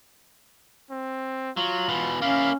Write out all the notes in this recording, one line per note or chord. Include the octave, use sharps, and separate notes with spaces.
C4
F#3 F4
B2 E3
A#3 C#4 E4 F5